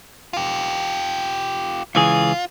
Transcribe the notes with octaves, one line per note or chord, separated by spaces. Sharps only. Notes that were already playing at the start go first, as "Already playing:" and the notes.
F4 G4
C#2 E3 F4 G#4